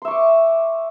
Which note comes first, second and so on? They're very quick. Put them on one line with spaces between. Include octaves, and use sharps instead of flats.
C6 E5 C#6 D5